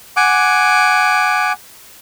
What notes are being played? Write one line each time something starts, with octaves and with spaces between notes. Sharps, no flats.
F#5 G#5 D6